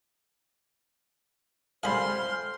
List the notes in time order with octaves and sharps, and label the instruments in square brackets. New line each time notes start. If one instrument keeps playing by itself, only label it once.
[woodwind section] F2 C5 F6 [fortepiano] G3 G#4 [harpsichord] F5 B5 [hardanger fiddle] C6